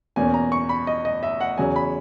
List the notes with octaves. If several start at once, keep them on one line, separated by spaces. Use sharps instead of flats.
E2 B2 A#3 C#4 G#5
A#5
C#6
B5
D#5
D#5
E5
F#5
E2 C#3 F#3 G#5
B5